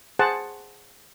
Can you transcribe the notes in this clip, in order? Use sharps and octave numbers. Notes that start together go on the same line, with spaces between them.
G#4 C5 F#5 A5